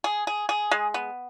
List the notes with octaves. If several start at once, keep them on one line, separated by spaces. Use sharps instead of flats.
G#4
G#4
G#4
G#3
B3